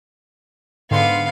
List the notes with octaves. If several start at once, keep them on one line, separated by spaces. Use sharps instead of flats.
G#2 D3 B3 F5 C6